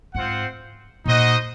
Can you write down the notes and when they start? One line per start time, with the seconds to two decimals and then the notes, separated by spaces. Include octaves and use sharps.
0.14 G#2 C4 F4 C5 F#5
1.05 A#2 D#4 F#4 C5 D#5 F#5